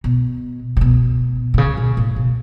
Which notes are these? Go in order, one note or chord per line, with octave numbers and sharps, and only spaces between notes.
B2
C#3
B2
B2
C#3
B2
A2
B2